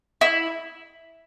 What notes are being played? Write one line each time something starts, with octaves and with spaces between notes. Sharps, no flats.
E4